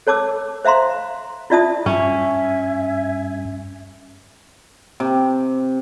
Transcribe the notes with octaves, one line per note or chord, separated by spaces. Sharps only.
A4 C#5 A5 D6 E6
C5 E5 F5 A#5 C6
E4 F4 D5 E5 A5 D#6
G2 C#4 E5 G#5
C3